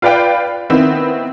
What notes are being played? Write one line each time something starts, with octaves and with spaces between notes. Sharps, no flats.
F4 B4 D5 F5 G5
D#3 B3 C4 E4